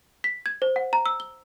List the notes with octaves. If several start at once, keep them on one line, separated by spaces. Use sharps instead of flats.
B6
G#6
C5
F#5
A#5
E6
G7